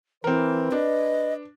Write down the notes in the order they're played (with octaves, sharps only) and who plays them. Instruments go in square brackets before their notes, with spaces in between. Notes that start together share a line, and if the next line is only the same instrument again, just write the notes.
[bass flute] E3 [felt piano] C4 A#4 [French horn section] B4
[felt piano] D4 [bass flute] D#5